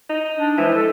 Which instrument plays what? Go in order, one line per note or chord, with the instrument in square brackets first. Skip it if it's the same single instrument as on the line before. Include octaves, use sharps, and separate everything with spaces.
[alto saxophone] D#4
[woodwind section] D4
[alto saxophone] E3 [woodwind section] F3 G#3
[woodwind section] A4